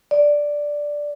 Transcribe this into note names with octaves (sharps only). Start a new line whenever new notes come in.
D5